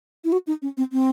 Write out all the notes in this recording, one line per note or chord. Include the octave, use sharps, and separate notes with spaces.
E4
F#4
D#4
C#4
C4
C4